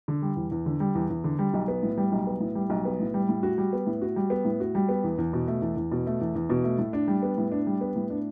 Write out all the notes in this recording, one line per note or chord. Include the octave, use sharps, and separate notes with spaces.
D3
G3
E2
E2
D3
G3
E2
E2
D3
G3
B1
B3
A2
G3
B1
B3
A2
G3
B1
B3
A2
G3
A2
F#4
G3
B3
A2
F#4
G3
B3
A2
F#4
G3
B3
E2
E2
B2
A3
E2
E2
B2
A3
E2
E2
B2
A3
A2
D4
G3
B3
A2
D4
G3
B3
A2
D4